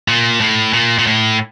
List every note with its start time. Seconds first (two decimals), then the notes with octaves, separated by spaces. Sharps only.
0.08 A#2
0.41 A2
0.74 A#2
0.99 A#2
1.07 A2